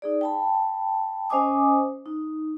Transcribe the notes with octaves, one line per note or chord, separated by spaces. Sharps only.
D#4 G#4 D5
G5 A5 B5
C#4 C5 D#5 G#5 D6 D#6
D#4